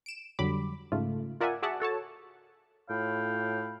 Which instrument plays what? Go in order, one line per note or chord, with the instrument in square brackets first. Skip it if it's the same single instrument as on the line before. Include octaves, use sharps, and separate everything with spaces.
[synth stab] D7 E7
F2 D3 F#3 G3 B5 D6
G#2 C#3 A3 F4
F4 A#4 D5 E5 F#5 G#5
F#4 G#4 D5 E5 F#5 A5
F#4 A4 C#5 A5
[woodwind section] A2 F4 C#5 F5 G5 B5